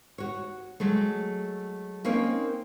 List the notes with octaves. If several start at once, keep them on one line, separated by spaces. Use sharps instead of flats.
F#4 C#5
F#3 G#3 A3
A#3 C4 C#4 D#4 A#4 C#5